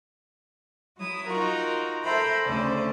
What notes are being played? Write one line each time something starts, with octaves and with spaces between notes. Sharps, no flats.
F#3 E4 D#6
D#4 F4 F#4 A#4
A4 C5 E5 G5 A#5 B5
D2 C#3 C#4 A4 C5 D5